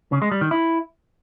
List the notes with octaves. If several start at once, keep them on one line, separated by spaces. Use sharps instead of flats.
C#3
G#3
G3
D#3
E4